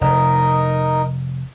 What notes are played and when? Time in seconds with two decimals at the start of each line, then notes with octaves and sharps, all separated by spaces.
0.01 F1 D#4 A#4 D#5